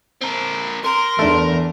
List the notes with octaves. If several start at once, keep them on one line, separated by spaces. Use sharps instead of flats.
C4 A#4
A#4 A#5 C6
E2 A3 D4